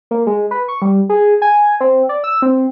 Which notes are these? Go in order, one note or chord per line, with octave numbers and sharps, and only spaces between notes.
A#3
G#3
B4
C#6
G3
G#4
G#5
C4
D5
E6
C4